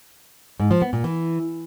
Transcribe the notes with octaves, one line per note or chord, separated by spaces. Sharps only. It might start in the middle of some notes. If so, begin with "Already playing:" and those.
G#2
F3
B3
A#2
E3